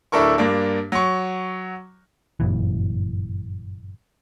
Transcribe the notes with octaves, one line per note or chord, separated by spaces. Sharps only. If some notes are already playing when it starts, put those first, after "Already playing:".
D1 D4 E4 A4 A#4 C#6
G2 A#3 D4
F#3 C#6
G1 F#2 A#2 E3